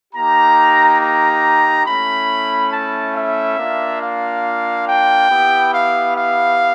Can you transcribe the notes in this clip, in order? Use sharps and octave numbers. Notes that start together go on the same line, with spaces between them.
A#3 D#4 G4 A#5
A#5
A3 C#4 E4 B5
A5
E5
A#3 D4 F4
F5
G5
B3 E4 G4
F5
F5